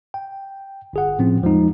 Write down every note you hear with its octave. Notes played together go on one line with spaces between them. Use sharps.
G5
G1 G#4 F#5
A2 F3 C4 C#4
E2 F3 G#3 D#4